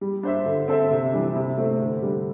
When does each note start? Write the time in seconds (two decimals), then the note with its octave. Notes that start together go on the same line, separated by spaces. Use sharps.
0.01 G3
0.23 D4 C5 E5
0.46 D3
0.68 C4 A4 C5 E5
0.90 C3
1.12 E3 G3 D4
1.36 C3
1.58 A3 C4
1.80 D3
2.02 G3 D4